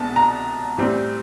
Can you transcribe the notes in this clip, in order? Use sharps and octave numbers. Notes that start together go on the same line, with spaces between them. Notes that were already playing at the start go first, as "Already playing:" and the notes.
Already playing: C2 B2 G#3 B3 D4 A5
A#5
A2 E3 G3 C4